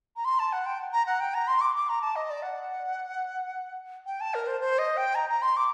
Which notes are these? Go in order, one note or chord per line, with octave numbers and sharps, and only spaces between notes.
A#5
C6
A5
F#5
G5
A#5
F#5
G5
A#5
C6
D6
D6
A#5
A5
D#5
D5
F#5
G5
A5
A#4
C5
C5
D#5
G5
A#5
A#5
C6
D6